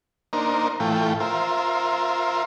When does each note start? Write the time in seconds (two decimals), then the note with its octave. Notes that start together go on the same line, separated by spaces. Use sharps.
0.33 A#3 D4 D#4 A#4 C5
0.80 A2 E3 A3 F4 G5
1.20 F4 A#4 C5 E5